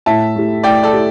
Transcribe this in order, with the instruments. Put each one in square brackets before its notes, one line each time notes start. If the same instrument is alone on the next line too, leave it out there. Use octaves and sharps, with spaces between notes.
[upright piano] A2 [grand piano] E5 A5
[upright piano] A3 E4 G4
[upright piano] A2 [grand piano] D5 G5
[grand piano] A4 D5
[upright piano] E4 G4